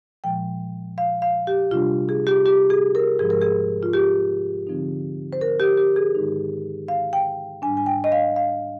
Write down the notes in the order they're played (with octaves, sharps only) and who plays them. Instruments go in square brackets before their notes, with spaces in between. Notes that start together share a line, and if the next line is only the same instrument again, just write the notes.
[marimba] A#2 F3 G#3 G5
F5
F5
G4
C3 G3 D4 F4
G#4
G4
G4
G#4
A#4
G#2 F3 G#3 G#4
A#4
G#4
F4
G4
D3 F3 C4 D#4
C5
A#4
G4
G4
G#4
G#2 D#3 G#3 D#4
F5
G5
G#2 G3 D4 G#5
G#5
G5
D#5
F5
F5